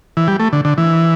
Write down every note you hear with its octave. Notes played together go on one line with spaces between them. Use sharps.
E3
G3
A3
D3
D3
E3